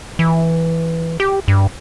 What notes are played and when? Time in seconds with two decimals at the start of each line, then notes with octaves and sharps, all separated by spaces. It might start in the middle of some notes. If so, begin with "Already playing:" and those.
0.19 E3
1.20 G4
1.48 G2